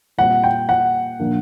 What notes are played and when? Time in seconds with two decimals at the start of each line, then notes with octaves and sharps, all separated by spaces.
0.18 A#2 G3 C4 F#5
0.44 G5
0.69 F#5
1.19 A#2 F3 A#3 D4